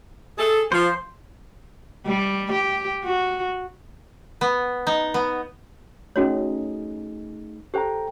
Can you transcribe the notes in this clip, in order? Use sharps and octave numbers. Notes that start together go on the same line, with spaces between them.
G#4 A4
F3 C5
G3
G4
F#4
B3
D#4
B3
A3 C#4 D#4 F#4 G#4 C#5
G4 A4 C5 G5 A#5